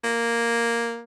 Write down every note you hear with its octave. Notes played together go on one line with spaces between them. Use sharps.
A#3